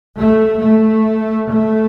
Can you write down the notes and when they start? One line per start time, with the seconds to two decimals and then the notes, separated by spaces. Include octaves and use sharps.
0.18 A3
0.62 A3
1.50 A3